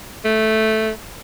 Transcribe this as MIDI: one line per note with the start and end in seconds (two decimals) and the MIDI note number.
0.25 0.90 57